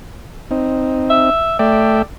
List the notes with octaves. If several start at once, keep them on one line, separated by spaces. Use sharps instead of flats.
C4 D#4
E5
A3 D5 E5 G5